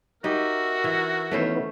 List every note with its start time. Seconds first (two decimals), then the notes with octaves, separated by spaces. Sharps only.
0.24 D#4 F#4 G4 A#4 E5
0.84 E3
1.31 D#3 E3 A3 B3 C#4 C5